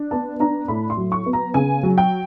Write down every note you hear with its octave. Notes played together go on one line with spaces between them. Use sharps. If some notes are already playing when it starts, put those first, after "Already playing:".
Already playing: D4
B3 A5
D4 A#5
A2 B5
C6
F#3
C#6
B3
A#5
C#3 G#5
F#3
G5